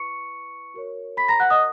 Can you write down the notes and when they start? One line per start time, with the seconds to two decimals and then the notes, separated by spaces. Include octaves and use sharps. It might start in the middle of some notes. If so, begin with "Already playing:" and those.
Already playing: E4 B4 C#6 C#7
0.74 F#4 A#4 C#5
1.17 B5 B6
1.29 A#5 A#6
1.40 F#5 F#6
1.50 D#5 D#6